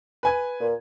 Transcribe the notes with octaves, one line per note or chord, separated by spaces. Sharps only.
B4 G#5 G#6
A#2